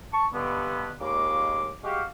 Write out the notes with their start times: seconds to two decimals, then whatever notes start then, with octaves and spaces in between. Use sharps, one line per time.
0.13 A5 C#6
0.33 G2 B2 D3 B3
1.01 D#2 A#2 C#3 G#3 A#3 D6
1.84 G#3 F#4 G4 F5